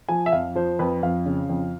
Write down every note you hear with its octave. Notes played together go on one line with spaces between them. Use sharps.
F3 G#5
E5
F2 F5
F3 C5
F2 B4
F2 F5
C#3
F2